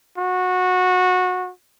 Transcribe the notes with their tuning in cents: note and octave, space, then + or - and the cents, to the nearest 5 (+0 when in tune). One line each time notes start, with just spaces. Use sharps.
F#4 -20